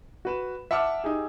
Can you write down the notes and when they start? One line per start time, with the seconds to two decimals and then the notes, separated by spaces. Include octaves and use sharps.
0.25 F#4 B4 E7
0.71 E5 F#5 A5 D6 E6 F6
1.04 D#4 G4 G#4